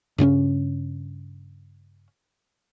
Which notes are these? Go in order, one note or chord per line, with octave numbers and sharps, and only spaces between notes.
G2 C#3 C4 C#4